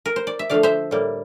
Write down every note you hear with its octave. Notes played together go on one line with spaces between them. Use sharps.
A#4
C5
D5
E5
D3 F3 A3 D5 F5
C5 E5
A2 G3 A#3